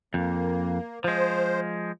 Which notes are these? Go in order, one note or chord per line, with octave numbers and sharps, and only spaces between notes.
F2 A#3
F3 G#3 C5